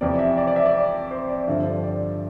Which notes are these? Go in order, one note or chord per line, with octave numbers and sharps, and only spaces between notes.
F2 C3 E3 D5
E5
D5
D5
E5
D5
C5
D5
G2 D3 F3 E5
D5
C5
D5